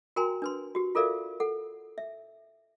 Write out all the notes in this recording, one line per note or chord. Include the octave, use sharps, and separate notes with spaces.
F#4 A#4 G5 G#5 A#5 C6
D4 B4 C6
F#4 G4
F4 A4 A#4 D5 E5 F5
A4 F#5
E5